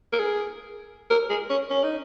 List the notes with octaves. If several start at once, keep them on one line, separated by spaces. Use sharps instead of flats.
A#4
G#4
A#4
G#4
C#4
C#4
D#4